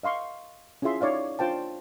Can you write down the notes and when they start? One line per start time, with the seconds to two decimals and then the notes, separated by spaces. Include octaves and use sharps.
0.03 D#5 F5 C6 C#6
0.82 C#4 E4 F4 G#4 E5 C6
1.01 D#4 C#5 D5 F5
1.39 D4 F4 C5 G5 A5